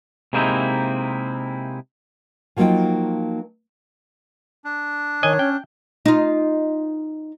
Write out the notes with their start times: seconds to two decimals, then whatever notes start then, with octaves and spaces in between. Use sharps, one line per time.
0.33 C3 G#3 A#3 C4 D#4 E4
2.57 F3 F#3 A#3 D#4 F4 G5
4.64 D4
5.23 D#3 C#5 D#5 G#5
5.39 C#4 G5
6.06 D#4 F4